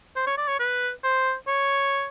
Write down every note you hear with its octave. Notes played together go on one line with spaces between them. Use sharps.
C5
C#5
D5
C#5
B4
C5
C#5